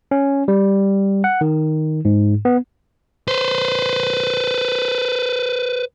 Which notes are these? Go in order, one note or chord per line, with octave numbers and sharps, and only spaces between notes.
C#4
G3
F#5
D#3
G#2
B3
B4 C5